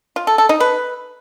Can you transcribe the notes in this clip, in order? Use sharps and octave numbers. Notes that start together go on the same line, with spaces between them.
F4
A4
A4
D#4
B4